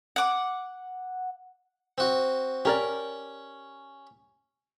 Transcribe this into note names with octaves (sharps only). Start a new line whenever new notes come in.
F#5 D6
C4 F#4
C#4 G4 A#4 D5